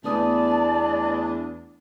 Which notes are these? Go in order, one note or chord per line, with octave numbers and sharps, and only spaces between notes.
E2 A3 B3 D4 D5 A5 D#6